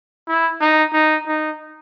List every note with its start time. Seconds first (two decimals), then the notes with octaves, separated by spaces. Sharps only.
0.28 E4
0.60 D#4
0.93 D#4
1.27 D#4